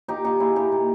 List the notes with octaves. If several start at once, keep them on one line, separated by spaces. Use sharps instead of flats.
A#2 D#4 G4
A#2 D#4 G4
A#2 E4 G#4
A#2 D#4 G4
A#2